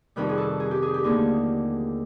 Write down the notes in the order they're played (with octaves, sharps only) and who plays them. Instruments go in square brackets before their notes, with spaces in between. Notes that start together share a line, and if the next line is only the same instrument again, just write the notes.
[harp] F2 C3 D#3 G3 B4
G#4
A4
G#4
G4
G#4
G4
D#2 D3 F3 A3 G#4